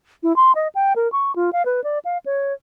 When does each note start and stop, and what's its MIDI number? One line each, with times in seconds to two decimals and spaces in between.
0.23 0.35 64
0.36 0.52 84
0.55 0.68 75
0.75 0.93 79
0.96 1.10 70
1.12 1.34 85
1.36 1.50 65
1.53 1.65 77
1.65 1.83 71
1.84 1.99 74
2.05 2.18 77
2.26 2.53 73